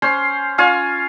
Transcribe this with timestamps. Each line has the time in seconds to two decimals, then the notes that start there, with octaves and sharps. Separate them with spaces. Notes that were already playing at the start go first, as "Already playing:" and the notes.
0.02 C#4 C5 C6
0.58 C#4 F4 F5 G#5